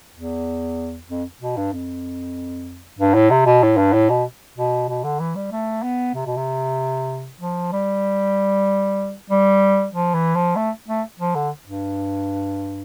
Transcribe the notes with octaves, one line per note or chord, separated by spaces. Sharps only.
E2
F2
B2
G2
F2
G2
A2
C3
B2
A2
G2
A2
B2
B2
B2
D3
E3
G3
A3
B3
C3
B2
C3
F3
G3
G3
F3
E3
F3
A3
A3
F3
D3
G2